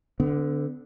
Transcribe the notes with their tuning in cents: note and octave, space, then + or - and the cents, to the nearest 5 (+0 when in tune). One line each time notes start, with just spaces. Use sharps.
D3 -5 B3 +35